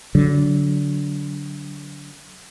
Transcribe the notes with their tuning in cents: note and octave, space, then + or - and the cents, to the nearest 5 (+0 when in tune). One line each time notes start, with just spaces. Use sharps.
D3 -25 F#3 +0